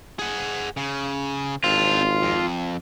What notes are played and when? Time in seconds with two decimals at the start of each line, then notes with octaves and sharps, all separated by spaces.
0.19 G#4 F#5
0.77 C#3
1.64 G#1 C4 D4 F4
2.22 F2